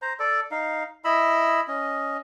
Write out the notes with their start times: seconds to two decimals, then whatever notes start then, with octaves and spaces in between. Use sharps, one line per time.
0.02 C5 A#5
0.19 A4 D5
0.51 D#4 F5
1.05 E4 D#5 B5 E6
1.68 C#4 D#5